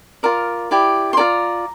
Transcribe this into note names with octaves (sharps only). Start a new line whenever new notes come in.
F4 A#4 D5
E4 G4 D5
C6
F4 A4 D5 A#5